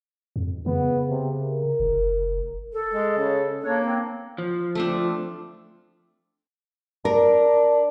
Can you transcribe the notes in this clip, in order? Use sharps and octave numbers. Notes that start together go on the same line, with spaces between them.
F2
C#3 B3
C3
A#4
F1
A4
G#3
C#3
A#3 D4 C#5
C4
F3
A3 C4 D4
D4 A#4